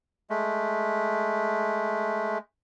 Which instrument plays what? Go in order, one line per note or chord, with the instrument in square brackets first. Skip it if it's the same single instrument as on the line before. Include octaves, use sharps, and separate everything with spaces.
[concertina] G#3 A3